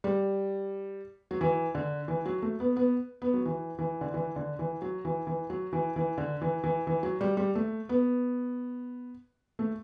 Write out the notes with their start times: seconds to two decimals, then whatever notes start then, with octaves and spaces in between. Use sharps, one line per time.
0.04 G3
1.31 F#3
1.41 E3
1.75 D3
2.08 E3
2.26 F#3
2.42 A3
2.60 B3
2.77 B3
3.22 B3
3.34 F#3
3.45 E3
3.79 E3
4.01 D3
4.14 E3
4.36 D3
4.59 E3
4.82 F#3
5.05 E3
5.27 E3
5.50 F#3
5.73 E3
5.96 E3
6.18 D3
6.42 E3
6.64 E3
6.87 E3
7.03 F#3
7.21 G3
7.37 G3
7.55 A3
7.89 B3
9.59 A3